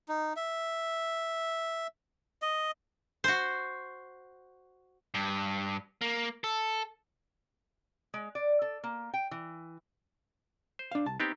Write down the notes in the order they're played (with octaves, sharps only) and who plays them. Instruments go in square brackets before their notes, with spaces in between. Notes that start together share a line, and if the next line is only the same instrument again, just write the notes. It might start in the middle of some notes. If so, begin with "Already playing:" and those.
[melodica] D#4
E5
D#5
[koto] F#4 C5
[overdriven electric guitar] G2
A#3
A4
[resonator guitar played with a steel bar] G#3
D5
A4
A#3
G5
E3
[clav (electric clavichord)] C5
[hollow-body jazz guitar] D4 F5
C2 A5
[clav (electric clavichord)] B3 C4 G4 [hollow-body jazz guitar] D#4